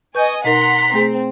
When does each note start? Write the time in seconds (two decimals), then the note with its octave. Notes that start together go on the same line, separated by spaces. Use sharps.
0.15 B4 D#5 G#5 C#6 G6
0.44 B2 D#4 A#4 F#5 A#5 C6 B6
0.94 A3 C4 G#4